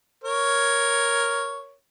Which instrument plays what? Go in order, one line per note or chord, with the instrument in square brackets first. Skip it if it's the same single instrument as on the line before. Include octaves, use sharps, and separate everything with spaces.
[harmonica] A#4 C#5